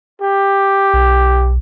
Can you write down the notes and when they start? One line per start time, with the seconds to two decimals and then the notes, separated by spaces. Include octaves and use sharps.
0.21 G4
0.94 B1